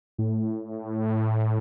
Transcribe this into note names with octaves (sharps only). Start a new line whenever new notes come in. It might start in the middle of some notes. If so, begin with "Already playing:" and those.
A2